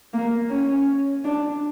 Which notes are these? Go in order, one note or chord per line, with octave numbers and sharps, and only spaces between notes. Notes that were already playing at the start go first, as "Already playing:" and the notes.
A#3
C#4
D4